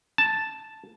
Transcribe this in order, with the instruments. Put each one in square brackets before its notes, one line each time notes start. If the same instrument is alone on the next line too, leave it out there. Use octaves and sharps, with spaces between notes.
[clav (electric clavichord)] A5